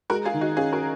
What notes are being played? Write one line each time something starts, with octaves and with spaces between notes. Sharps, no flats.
G#3 F#4 A#4
F4 G#4
D#3
D#4 F#4
C#4 F4 G#4
F#4 A#4